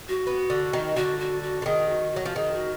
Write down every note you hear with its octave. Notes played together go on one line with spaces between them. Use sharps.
F#4
B3
D3
D#3
D3 F#4
F#4
F#4
D3
D#3 G#4
F#4
F#3 F#4
F3
D#3 G#4
F#4